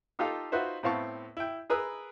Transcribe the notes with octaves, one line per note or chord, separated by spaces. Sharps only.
D#4 F4 G4 A4 F5
D#4 F4 F#4 B4 C5 E5
A2 B3 C4 F5 A5 C#6
E4 G5
G#4 A#4 B4 B5 D#6 E6